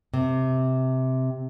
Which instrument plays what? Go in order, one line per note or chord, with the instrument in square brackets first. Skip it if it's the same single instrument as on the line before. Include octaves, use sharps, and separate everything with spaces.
[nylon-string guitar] C3